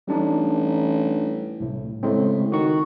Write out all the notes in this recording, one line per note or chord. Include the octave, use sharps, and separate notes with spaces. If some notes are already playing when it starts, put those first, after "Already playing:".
A1 G3 D4 D#4
C2 A2
A2 C#3 G#3 C4
D#3 F#4 C#6